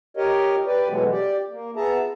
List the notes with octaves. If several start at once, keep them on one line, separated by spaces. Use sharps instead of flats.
G4 A#4 C#5 D#5
G4 B4 D5
B2 E3 F#3 G#3 A3 B3
G4 D5
A#3
B3 G#4 E5 A5 A#5